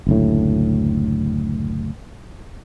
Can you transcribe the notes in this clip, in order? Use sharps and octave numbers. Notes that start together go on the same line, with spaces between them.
F#1 D2 A2